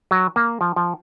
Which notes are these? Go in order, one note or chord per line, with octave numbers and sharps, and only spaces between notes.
F#3
A#3
F3
F3